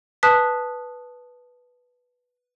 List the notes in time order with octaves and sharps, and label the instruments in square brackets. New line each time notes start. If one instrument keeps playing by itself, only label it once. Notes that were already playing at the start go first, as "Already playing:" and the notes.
[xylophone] B4 A5 D#6 F#6 B6